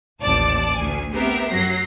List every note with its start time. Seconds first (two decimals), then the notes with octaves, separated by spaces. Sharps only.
0.21 A1 D#2 D5 A5
0.74 D2 G#5
1.12 B3 C4 G4 A#4 E5
1.47 F#2 F#3 A#6 C7